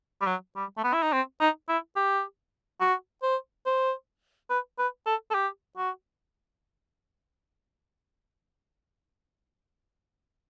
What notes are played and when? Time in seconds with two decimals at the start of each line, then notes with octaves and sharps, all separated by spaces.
0.21 G3
0.27 F#3
0.56 G3
0.77 A3
0.84 B3
0.93 E4
1.02 D#4
1.12 C4
1.40 D#4
1.69 E4
1.96 G4
2.81 F#4
3.23 C5
3.66 C5
4.50 B4
4.79 B4
5.06 A4
5.30 A4
5.34 G4
5.77 F#4